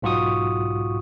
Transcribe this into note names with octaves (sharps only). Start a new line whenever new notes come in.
B1 G#2 F4 F#4 C#6 D#6